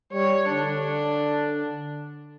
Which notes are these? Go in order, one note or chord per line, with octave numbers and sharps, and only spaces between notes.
G3 C#5
D3 D4